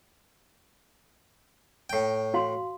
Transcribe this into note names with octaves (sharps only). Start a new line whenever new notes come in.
A2 G5
F#4 F5 C6